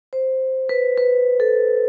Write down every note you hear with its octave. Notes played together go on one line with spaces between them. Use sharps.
C5
B4
B4
A4